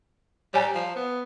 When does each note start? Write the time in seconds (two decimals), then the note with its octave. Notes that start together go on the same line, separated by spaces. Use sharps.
0.54 G3 C#5 G#5 A#5
0.75 F3
0.96 B3